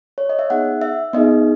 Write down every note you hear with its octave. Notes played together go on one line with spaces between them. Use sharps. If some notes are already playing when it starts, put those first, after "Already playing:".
C#5
D#5
E5
B3 D#4 G#4 F#5
E5
B3 D#4 G#4 D#5